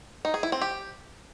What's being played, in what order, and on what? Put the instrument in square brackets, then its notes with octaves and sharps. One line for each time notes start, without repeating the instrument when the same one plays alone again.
[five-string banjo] D#4
G#4
E4
C4
G4